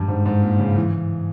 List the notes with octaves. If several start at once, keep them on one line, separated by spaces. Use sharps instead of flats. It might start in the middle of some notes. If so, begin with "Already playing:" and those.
Already playing: G2
G#2
G#2
A#2
C#3
E3